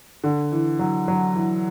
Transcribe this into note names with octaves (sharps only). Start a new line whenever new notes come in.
D3
E3
F#3
F#3
E3